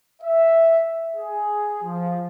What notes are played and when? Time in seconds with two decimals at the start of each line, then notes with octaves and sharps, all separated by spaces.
0.22 E5
1.16 G#4
1.83 F3